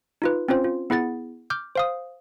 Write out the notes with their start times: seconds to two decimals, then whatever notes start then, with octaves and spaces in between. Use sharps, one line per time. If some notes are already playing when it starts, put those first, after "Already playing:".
0.22 D#4 F4 B4
0.49 C4 C#4 F4 C5
0.64 F4
0.90 B3 E4 G#4 F#5 A6
1.50 D6 F6 G6
1.76 C5 F5 D#6